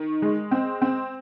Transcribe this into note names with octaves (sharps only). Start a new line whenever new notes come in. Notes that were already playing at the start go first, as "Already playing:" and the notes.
Already playing: D#3
G#3
C4
C4